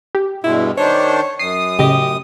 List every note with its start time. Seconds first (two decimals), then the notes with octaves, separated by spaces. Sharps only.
0.15 G4
0.44 G2 B2 G#3 E4
0.78 D#3 D4 C5 C#5
1.39 F#2 D#6 C7
1.79 A2 C#3 G4 D#5